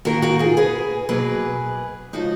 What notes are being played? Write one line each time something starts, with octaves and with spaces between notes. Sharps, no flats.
D#3 A#3 F#4 A#4
F#4 A#4
F4 G#4
G#4 B4
B2 F#3 A#3 G#4 B4
C#3 F3 G#3 D#4 F#4